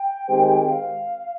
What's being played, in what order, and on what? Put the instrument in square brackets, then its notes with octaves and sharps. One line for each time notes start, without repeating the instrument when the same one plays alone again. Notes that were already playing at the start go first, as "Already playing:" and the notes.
Already playing: [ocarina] G5
[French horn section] D#3 G#3 C4 G4 C5
[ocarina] F5